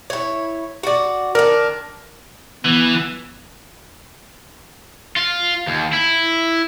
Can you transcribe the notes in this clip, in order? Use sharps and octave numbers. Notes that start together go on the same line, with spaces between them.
E4 C#5
F#4 D5
D#3 D4 A#4
E3 B3
F4
D#2
E4